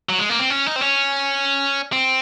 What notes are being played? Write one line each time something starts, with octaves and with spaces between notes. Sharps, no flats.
F#3
G#3
A#3
C4
C#4
D#4
C4
C#4
C4